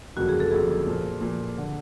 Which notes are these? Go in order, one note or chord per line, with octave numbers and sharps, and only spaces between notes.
G1 F2 C#3 F#3 A#3 F#4
G#4
A4
G1 F2 C#3 F#3 A#3 G#4
A#2 F3 A#3
A#2 F3 A#3
D3